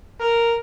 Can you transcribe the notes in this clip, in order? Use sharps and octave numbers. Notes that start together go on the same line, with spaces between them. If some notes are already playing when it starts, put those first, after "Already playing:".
A#4